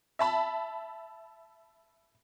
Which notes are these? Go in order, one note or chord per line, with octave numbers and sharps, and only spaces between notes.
E5 A5 B5